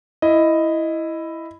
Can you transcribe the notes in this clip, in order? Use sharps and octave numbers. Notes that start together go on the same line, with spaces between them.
E4 D#5